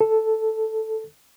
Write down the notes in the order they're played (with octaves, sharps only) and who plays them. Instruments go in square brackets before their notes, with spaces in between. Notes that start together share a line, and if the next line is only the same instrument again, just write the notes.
[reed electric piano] A4